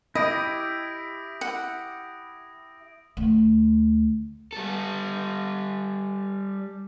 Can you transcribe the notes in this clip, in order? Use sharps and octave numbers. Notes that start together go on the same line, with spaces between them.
E4 G4 D#5 D#6 A#6 D7
F#5
D2
G3 A4